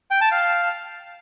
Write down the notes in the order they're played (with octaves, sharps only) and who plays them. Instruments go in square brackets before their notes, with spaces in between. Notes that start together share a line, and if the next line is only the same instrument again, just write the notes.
[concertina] G5
A5
F5